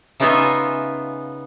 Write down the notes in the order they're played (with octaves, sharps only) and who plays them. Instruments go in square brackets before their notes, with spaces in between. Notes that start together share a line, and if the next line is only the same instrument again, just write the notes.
[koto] C#3 B3 D#4 F4 E5 G#5